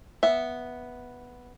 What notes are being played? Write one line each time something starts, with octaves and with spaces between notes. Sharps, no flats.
B3 E5